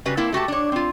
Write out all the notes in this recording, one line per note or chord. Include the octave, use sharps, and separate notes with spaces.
C#3 G3 F#4 B4
A#3 C4 E4 A5
A3 F#4 G4 A5
D4 C#5
C4 F4